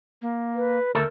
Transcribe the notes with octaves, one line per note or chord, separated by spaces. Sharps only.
A#3
B4
D2 A3 A4 A#4